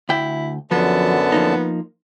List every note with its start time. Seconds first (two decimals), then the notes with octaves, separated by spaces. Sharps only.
0.09 D2 E4 G5
0.71 F#2 D3 F3 F#3 B3 A5
1.32 F3 A#3 D#4